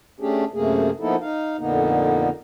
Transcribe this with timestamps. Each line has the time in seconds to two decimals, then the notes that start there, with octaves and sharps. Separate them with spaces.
0.20 A3 C#4 D4 G4 G#4
0.54 F#2 C3 A3 A#3 G#4
1.00 F3 A#3 B3 D#4 E4 A4
1.21 D#4 F5
1.59 F2 A#2 D3 A#3 B3 D#4